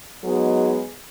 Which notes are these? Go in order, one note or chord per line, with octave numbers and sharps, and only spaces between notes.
F#3 G#3 B3 D#4 G#4